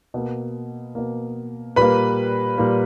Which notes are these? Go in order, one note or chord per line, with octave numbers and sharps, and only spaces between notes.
B2 A#3
B2 A#3
A#2 G3 A#3 B4 B5
A#2 G3 A#3